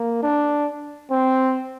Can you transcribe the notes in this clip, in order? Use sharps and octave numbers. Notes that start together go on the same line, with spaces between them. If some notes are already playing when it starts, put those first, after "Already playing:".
Already playing: A#3
D4
C4